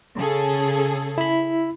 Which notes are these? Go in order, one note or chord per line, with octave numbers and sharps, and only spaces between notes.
C#3 G#4 A4
E4 B5